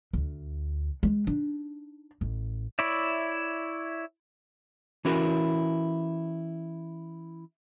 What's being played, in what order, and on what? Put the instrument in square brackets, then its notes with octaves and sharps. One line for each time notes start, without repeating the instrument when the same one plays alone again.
[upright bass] D2
G#3
D4 D#4
A1
[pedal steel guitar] E4 C#5 D5 E5
[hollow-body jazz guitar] E3 C#4 E4 F#4 A#4